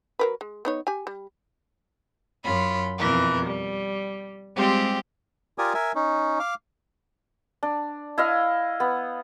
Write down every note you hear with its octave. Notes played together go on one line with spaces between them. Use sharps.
F#3 A#4 B4
G#3
B3 D#4 C#5
G4 G#5
G3
F#2 F4 B5
F2 B2 E3 A#4
G3
G3 G#3 C4 F4 G4
F4 G4 A#4 D5 G#5 D#6
A#4 E5 G#5
C#4 D#4
F5 D6
D4
E4 D#5 F5
B3